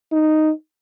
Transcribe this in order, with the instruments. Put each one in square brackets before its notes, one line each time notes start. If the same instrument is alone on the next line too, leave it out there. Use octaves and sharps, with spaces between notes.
[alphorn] D#4